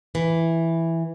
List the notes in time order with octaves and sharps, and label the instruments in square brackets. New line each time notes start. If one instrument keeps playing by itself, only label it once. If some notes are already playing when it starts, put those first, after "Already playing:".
[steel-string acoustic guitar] E3